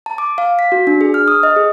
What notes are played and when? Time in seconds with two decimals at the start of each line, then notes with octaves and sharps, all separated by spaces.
0.06 A5
0.18 D6
0.38 F5
0.59 B6
0.72 F#4
0.87 D4
1.01 G#4
1.14 F6
1.28 D#6
1.43 D#5
1.56 G#4